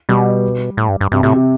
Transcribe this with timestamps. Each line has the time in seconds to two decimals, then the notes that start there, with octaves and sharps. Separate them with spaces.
0.09 B2 G3
0.77 A2
0.89 G2
1.01 G2
1.12 G2 C3
1.23 A2 C3
1.34 C3